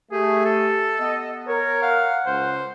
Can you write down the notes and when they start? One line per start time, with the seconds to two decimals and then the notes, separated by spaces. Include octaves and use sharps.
0.12 A3 G4 G#4
0.45 A4
1.00 B3 D#5
1.48 A#4 C#5
1.82 F5 F#5
2.26 C#2 C5